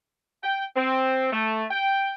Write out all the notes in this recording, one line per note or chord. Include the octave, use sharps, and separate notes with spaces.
G5
C4
A3
G5